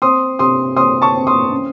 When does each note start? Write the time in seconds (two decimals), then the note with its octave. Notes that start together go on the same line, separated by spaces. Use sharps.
0.02 C4 C6 D#6
0.39 C3 C6 D#6
0.76 C4 C6 D#6
1.02 A5 C#6
1.15 C4
1.27 C6 D#6
1.51 C#4